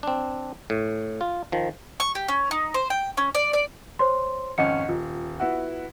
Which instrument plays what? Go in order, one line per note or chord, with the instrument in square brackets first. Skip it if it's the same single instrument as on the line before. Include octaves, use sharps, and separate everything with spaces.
[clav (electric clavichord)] C4 D4
A2
F4
D#3 F3
[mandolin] C#6
G4
C#4
D#4
C5
G5
C#4
D5
D5
[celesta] C5 C#5 C6
[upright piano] G#1 F2 C#4 [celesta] D#5 F#5 C#7
[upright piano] D#1 [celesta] F4
[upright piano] B3 E4 F#4